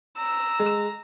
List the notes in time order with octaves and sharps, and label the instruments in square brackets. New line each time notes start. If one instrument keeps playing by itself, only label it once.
[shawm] A#5 [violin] E6
[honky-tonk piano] G#3